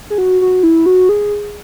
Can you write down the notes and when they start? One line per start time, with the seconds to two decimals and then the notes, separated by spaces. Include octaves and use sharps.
0.10 G#4
0.18 F#4
0.42 F#4
0.63 E4
0.86 F#4
1.09 G#4